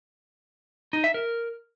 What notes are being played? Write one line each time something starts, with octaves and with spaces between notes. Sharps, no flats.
D#4
E5
A#4